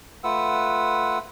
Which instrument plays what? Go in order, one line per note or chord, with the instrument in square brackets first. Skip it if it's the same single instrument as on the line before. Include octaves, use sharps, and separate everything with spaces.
[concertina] A3 F4 B4 F#5 E6